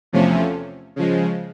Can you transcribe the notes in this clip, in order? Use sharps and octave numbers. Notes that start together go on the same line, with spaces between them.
E2 C3 F3 A3 C#4
C#3 F3 G#3